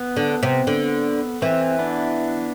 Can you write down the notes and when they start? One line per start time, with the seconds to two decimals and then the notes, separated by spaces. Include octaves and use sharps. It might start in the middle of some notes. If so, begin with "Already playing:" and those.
Already playing: B3
0.16 D3
0.43 C3
0.67 D3
1.42 E3 C4
1.79 B3 D4